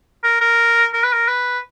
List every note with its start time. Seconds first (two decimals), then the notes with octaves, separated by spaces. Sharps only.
0.23 A#4
0.41 A#4
0.93 A#4
1.04 B4
1.13 A#4
1.28 B4